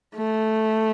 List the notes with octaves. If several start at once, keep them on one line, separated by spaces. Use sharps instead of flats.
A3